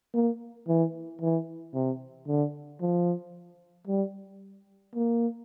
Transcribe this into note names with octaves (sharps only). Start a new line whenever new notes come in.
A#3
E3
E3
C3
D3
F3
G3
A#3